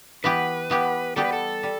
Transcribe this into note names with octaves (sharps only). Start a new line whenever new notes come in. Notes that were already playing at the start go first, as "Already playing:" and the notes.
E3 B3 G4 B4
E3 B3 G4
G3 B3 G4 A4
B4
A4
G3